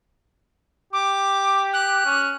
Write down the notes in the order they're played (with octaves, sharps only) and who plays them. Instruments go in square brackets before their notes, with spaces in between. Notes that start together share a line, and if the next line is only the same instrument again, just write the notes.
[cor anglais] G4 [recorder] D6
[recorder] F#6
[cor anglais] C#4